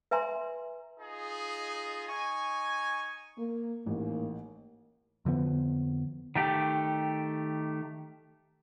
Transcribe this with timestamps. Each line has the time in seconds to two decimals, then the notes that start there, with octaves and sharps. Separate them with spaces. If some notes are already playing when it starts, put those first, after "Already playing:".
0.11 B4 E5 G#5 A#5 C6
0.99 D#4 F4 G#4
2.09 D#4 G#5 C#6
3.38 A#3
3.86 A1 D#2 G#2 A#3
5.25 F2 D3 F3 B3
6.35 D#3 A3 G4